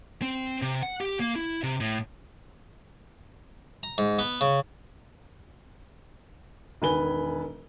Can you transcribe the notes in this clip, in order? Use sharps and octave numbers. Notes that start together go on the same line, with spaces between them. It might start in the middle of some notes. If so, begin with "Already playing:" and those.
C4
C3
F#5
G4
A#3
E4
C3
A2
A#5
G#2
B3
C#3
E1 D#3 B4 G#5 G7